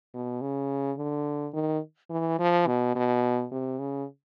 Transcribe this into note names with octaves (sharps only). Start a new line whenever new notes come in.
B2
C#3
D3
D#3
E3
F3
B2
B2
C3
C#3